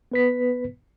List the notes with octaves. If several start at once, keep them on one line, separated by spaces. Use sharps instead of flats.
B3 B4 B6